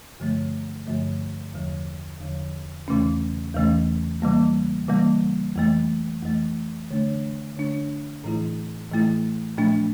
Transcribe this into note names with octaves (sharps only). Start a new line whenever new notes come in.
G2 D3 F3 A3
G2 D3 F3 A3
E2 D3 F3
E2 D3 F3
E2 C#3 E3 A3 C#4
E2 C#3 E3 A3 C#4
C#3 E3 G3 A#3
C#3 E3 G3 A#3
F2 E3 A3
F2 E3 A3
D3 A3 D4
D3 A3 D4
A2 E3 A3 E4
A2 E3 A3 E4
A#2 F3 A3 D4